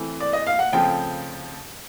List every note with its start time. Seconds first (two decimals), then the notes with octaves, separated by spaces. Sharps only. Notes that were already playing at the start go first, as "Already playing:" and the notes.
Already playing: E3 A3 C4
0.20 D5
0.33 D#5
0.47 F5
0.59 F#5
0.72 C#3 F3 A3 C4 G5